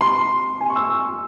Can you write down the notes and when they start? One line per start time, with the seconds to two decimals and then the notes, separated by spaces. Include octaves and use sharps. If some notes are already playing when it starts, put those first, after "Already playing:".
0.01 C6
0.61 G#5
0.70 C#6
0.76 E6